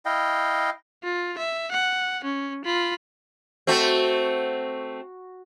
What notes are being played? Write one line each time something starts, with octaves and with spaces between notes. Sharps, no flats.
E4 D#5 F5 G5
F4
E5
F#5
C#4
F4 B5
A3 C4 F#4